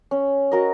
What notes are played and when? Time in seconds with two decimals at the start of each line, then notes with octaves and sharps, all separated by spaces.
0.11 C#4
0.51 F#4 A#4 D#5